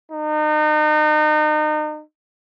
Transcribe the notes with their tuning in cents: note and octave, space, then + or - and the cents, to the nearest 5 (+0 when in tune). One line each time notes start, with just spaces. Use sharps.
D#4 -35